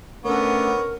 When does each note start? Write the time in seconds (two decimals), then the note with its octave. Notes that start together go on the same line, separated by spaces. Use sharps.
0.25 D3 A3 B3 C#4 A#4 C#5